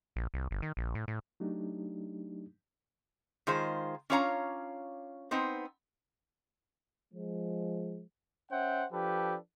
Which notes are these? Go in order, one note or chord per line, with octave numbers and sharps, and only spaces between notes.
A#1
C2
G1
D#3
A#1
A2
A2
F#3 A3 D4 D#4 G4
D#3 G#3 F4 C5
C#4 D4 F4 C#5 F5 A#5
B3 C4 D#4 C5
F3 G#3
C#4 C5 E5 F#5 G5
F3 D4 G4 A4 B4